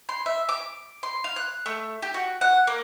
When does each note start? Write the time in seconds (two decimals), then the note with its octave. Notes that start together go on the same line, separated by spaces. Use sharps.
0.09 C6
0.26 E5
0.49 D6
1.03 C6
1.24 F5
1.36 F#6
1.66 A3
2.02 G4
2.14 F#4
2.41 F#5
2.67 A#3